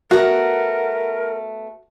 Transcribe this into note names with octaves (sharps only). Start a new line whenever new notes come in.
A3 B3 F#4 A#4